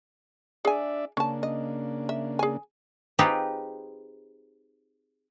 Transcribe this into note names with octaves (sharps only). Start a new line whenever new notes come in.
D4 G#4 D5 E5 G#5
C#3 A#3 C#4 D4 A5
D#5
E5
G#4 G#5
C4 D#4 F4 G4 G#4 B4